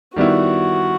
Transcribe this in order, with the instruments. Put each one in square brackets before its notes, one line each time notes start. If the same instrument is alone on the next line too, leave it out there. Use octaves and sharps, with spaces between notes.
[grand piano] D#3 G3 B3 E4 [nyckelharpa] F#4